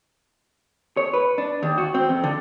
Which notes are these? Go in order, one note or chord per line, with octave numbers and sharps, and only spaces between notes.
C#5
B4
D4
D#2
F#4
C4
F2
D3